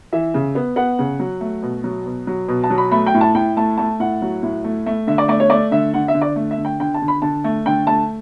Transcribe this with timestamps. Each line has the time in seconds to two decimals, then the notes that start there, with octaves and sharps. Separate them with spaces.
0.13 E3 E5
0.34 C#3
0.55 B3
0.76 B3 F#5
0.99 C#3
1.19 F#3
1.41 A3
1.63 B2
1.84 F#3
2.06 B2
2.27 F#3
2.48 B2
2.64 A5
2.70 F#3
2.78 B5
2.91 A3 B5
3.06 G5
3.14 A2
3.21 A5
3.34 A2 G5
3.57 A3 A5
3.78 A3 A5
4.00 A2 F#5
4.22 F#3
4.43 A2
4.64 A3
4.86 A3
5.07 D3 E5
5.18 D5
5.28 A3 D5
5.40 C#5
5.50 A3 D5
5.71 D3 E5
5.94 D3 F#5
6.08 E5
6.14 D3
6.21 D5
6.36 A3
6.51 E5
6.58 D3
6.65 G5
6.80 D3 G5
6.94 A5
7.02 D3
7.08 B5
7.22 D3 A5
7.44 A3
7.66 D3 G5
7.87 A3 A5